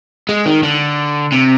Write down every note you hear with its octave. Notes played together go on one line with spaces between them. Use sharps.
G#3
D#3
D3
C3